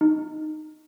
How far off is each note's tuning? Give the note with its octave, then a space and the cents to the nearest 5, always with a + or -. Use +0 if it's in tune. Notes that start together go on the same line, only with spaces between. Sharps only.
D#4 -10